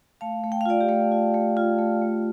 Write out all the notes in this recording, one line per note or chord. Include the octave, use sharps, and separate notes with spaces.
A3 F5 A5
A3
G5
F5
F4 D5 G5
G4
A3
F4
A3
F4
A3
A3